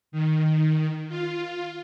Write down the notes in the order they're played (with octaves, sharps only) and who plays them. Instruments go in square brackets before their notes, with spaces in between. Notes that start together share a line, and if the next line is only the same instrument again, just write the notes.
[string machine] D#3
F4